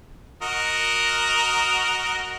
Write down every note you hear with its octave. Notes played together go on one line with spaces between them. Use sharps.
F#4 A#4 D#5